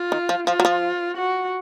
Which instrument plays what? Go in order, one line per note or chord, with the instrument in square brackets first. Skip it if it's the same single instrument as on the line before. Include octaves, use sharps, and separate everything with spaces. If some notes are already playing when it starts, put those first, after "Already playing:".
Already playing: [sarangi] F4
[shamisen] D#3
F3
[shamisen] F3 [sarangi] F4
[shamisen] F#3
F3
[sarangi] F#4